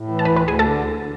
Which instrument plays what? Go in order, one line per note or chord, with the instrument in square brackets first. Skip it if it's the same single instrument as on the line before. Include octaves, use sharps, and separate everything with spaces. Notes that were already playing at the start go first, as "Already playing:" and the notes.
Already playing: [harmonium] A2
E3
[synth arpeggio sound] A5
[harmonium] D2 [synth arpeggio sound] B4 B5
[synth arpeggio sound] B4 B5
[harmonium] D2
[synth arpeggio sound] G#4 G#5
[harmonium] D3 [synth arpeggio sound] A4 A5
[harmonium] D2